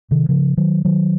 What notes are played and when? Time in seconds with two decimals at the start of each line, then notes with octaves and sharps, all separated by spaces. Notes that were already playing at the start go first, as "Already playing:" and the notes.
0.11 C3 D#3
0.29 C#3 F3
0.57 D#3 F#3
0.85 D#3 F#3